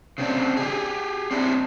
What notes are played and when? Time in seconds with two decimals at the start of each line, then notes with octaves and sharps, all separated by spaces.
0.18 C#3 C4 D4
0.57 G4 G#4
1.31 C4 D4 E4